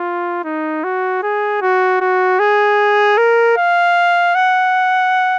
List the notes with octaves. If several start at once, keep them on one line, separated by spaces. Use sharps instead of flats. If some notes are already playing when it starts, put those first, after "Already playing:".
Already playing: F4
D#4
F#4
G#4
F#4
F#4
G#4
A#4
F5
F#5